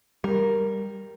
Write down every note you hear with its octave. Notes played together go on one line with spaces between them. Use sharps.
G3 A#4